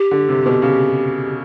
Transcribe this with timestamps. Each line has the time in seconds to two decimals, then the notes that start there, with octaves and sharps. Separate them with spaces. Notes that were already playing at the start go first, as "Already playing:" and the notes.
Already playing: G4
0.11 D3
0.29 C3
0.46 B2
0.62 C#3